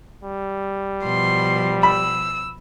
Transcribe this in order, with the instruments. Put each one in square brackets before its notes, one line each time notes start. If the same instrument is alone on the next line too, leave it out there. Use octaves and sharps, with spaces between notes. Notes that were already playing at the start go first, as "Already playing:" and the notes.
[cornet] G3
[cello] B2 F3 [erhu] C6
[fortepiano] B5 [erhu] E6